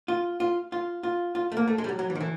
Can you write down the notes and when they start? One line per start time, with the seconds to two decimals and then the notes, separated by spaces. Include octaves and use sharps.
0.08 F4
0.40 F4
0.72 F4
1.03 F4
1.35 F4
1.52 A3
1.57 A#3
1.68 A3
1.78 G#3
1.84 G3
1.89 F#3
1.99 F#3
2.10 E3
2.15 D#3
2.21 E3